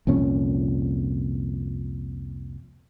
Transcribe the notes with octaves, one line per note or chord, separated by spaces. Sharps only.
C2 F2 A#2 C#4